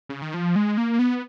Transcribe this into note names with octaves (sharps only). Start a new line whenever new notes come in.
C#3
D#3
F3
G#3
A#3
B3